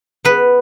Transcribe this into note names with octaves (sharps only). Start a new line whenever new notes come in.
B3 B4